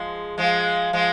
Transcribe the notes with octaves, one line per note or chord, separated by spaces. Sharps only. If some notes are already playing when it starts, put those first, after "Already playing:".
Already playing: F3 G#3
F3 G#3
F3 G#3